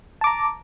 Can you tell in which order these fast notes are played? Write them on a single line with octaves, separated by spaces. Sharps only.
A5 D6 A#5